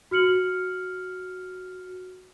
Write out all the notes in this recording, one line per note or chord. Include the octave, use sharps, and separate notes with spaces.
F#4 F6 C#7 F#7